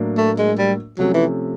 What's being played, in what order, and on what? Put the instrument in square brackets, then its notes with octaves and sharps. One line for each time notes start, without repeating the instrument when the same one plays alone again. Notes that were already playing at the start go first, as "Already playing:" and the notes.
Already playing: [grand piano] A2 F#3 A#3 D4
[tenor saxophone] A3
G#3
G3
[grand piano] C3 F3 A3 C#4 [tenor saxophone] F#3
[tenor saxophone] E3